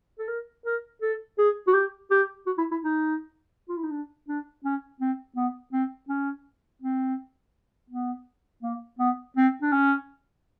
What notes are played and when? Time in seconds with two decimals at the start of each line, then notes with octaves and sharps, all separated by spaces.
0.19 A4
0.28 A#4
0.65 A#4
1.02 A4
1.38 G#4
1.67 F#4
1.74 G4
2.11 G4
2.47 F#4
2.58 E4
2.71 E4
2.83 D#4
3.69 F4
3.77 E4
3.84 D#4
3.91 D4
4.28 D4
4.65 C#4
5.01 C4
5.36 B3
5.73 C4
6.09 C#4
6.82 C4
7.90 B3
8.63 A#3
8.99 B3
9.36 C4
9.62 D4
9.72 C#4